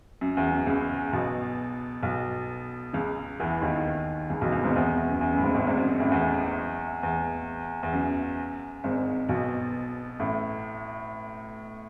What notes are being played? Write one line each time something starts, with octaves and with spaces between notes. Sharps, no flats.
F#2
E2
F#2
C#2 C#3
B1 B2
B1 B2
C#2 C#3
E2 E3
D#2 D#3
C#2 C#3
B1 B2
C#2 C#3
G#1 G#2
E2
E2
F#2
E2
F#2 A2
G#1 G#2
A1 A2
G#1 G#2
F#2
F#2
A1 A2
E2
E2
E2
F#2
G#1 G#2
B1 B2
A1 A2